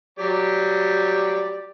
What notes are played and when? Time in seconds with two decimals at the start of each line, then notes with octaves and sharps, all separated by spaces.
0.19 F#3 G4 D5